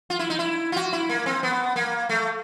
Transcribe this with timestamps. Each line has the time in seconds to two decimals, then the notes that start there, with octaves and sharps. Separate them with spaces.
0.10 F4
0.19 E4
0.30 D#4
0.39 E4
0.72 F4
0.76 F#4
0.93 E4
1.09 A#3
1.26 C4
1.43 B3
1.76 A#3
2.09 A3